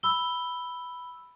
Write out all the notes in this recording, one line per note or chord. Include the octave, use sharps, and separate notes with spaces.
B5 E6 G7